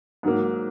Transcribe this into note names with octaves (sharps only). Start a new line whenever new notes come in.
G#2 F#3 A#3